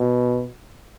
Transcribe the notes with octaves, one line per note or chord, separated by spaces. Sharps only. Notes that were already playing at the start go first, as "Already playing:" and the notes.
Already playing: B2